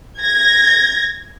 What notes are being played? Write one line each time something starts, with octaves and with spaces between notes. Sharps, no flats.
G#6 A#6